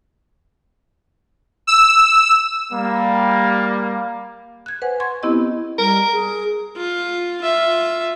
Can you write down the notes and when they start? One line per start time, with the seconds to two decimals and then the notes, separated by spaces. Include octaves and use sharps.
1.67 E6
2.72 G3 A#3
4.66 F#6 G#6
4.82 B4 C5 F#5 G#5
5.00 C6 C#6 G#6
5.23 B3 C4 E4 G4 D#5
5.79 G3 A#4
6.12 G#4
6.77 F4
7.42 F4 E5